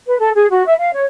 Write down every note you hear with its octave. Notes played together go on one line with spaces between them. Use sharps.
B4
A4
G#4
F#4
E5
F5
C#5